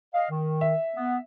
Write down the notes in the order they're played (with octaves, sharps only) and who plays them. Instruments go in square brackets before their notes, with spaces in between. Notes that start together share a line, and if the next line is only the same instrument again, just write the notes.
[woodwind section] D#5 F5
D#3
[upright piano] E5
[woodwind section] B3